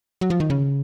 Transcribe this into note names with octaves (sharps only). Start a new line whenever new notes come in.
F#3
F3
D#3
C#3